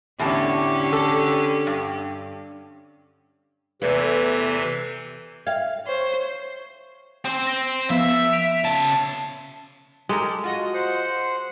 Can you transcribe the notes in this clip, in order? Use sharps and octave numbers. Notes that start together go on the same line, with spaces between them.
E2 A2 D3 C#4 G4 A5
A4
G2
E2 C3 E3 A3
E5 F5 G5 G#6
C5 C#5
C4 C5
A#6
F3 B3 E5
B6 D7 F7
C#3 A5
G#3 G4 A4 A#4
F4 F#4 D#5
C5 F#5